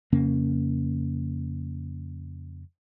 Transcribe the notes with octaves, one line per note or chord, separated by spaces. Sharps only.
F2 C#3 A#3 C#4